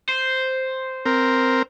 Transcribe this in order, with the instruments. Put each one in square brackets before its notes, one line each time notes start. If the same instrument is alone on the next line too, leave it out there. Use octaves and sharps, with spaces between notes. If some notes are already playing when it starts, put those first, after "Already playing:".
[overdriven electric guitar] C5
[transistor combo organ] C4 A#4